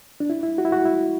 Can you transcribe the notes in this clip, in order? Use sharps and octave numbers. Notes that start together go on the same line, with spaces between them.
D4
E4
E4
F#4
E4
F#4
E4